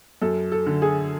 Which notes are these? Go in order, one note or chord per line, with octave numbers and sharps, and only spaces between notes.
F#2 A4
A4
D3
G#4